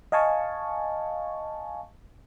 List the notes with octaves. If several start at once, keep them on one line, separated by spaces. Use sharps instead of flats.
D#5 F5 G#5 A5 C#6